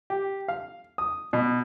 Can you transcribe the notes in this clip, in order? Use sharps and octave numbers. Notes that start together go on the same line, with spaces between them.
G4
F5
D#6
B2